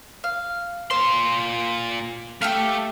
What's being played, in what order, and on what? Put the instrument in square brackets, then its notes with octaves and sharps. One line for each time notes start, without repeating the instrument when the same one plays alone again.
[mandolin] F5
[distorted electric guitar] A#2 C6 [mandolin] C5
[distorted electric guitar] A3 [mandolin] G4 E5 F5